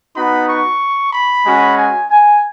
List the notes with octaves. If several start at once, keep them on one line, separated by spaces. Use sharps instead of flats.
B3 D#4 F#4 B5
C#6
B5
G#3 C#4 F#4
G#5
G#5